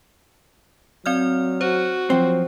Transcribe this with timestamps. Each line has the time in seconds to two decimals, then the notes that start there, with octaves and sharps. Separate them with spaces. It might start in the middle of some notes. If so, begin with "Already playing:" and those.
1.06 F#3 C4 D5 F6
1.61 F#4 C5
2.10 F3 F#3 C4